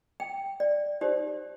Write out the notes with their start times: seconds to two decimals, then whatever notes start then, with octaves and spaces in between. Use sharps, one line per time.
0.20 G5
0.60 D5
1.01 D#4 G4 C5 D5